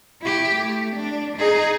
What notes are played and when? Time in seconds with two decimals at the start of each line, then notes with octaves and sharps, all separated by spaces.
0.22 E4 G4
0.55 A3
0.96 D4
1.37 D#4 G#4